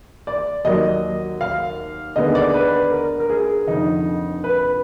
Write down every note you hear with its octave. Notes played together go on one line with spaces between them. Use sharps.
D5
D#2 D#3 F#3 A#3 D#5
F5
D#2 D3 G#3 B3 D#5
D5
B4
A#4
A#4
G#4
F1 F2 D3 D#4
B4